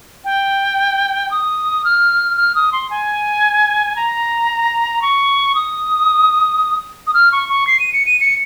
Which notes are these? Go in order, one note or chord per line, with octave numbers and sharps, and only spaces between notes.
G5
D#6
F6
F6
D#6
C6
G#5
A#5
C#6
D#6
D#6
F6
C#6
C#6
C7
D#7
C#7
D#7
C#7